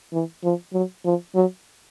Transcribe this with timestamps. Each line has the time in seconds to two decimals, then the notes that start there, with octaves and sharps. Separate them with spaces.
0.13 E3
0.43 F3
0.73 F#3
1.05 F3
1.35 F#3